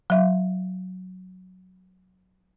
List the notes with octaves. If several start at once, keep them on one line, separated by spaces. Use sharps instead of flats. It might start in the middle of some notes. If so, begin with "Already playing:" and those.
F#3 E5 F5